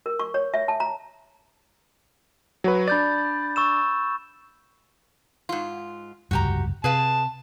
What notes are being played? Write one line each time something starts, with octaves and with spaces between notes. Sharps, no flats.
A#4
C#6
C#5
E5
A5
A#5
F#3 F#4 B4
D4 D5 B5 G6 A6
C#6 E6 E7
G#2 F4
F1 C#2 G2 F#4 G4 A#5
C3 G#4 B4 F5 A5